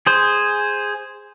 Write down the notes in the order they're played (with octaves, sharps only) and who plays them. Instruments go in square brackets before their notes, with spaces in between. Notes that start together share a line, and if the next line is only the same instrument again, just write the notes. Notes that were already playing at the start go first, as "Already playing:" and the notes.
[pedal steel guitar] G#4 C5